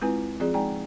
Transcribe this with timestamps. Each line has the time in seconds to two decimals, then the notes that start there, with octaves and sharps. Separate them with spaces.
0.01 G#3 C4 E4 F4 B4 G#5
0.40 F3 C4 F4 G#4 D5
0.54 G#3 D#4 D5 G5 G#5 A#5